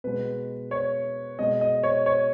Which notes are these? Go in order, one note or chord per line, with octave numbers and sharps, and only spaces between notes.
B2 G#3 B4
C#5
B2 G#3 D#5
D#5
C#5
C#5